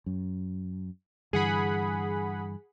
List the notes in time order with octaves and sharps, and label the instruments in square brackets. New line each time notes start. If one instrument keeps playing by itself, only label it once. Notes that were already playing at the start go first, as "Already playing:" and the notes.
[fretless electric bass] F#2
[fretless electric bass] G2 D3 E3 [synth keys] G#4 F#5 B5